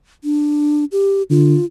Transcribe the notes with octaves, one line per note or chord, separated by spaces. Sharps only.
D4
G4
D3 F4